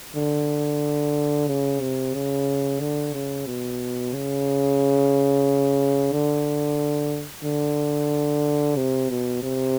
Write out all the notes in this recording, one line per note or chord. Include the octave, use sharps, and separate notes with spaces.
D3
C#3
C3
C#3
D3
C#3
B2
C#3
D3
D3
C3
B2
C3